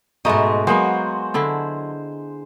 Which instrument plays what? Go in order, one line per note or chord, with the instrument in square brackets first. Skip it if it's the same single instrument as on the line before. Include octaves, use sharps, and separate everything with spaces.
[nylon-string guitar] G#2 D#5 [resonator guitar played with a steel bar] B2 A3 [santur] G#3 A#5
[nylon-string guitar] F#3 [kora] G#3 A#3 B3 [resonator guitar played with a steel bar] F#4 [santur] C5
[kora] D3 D4 E4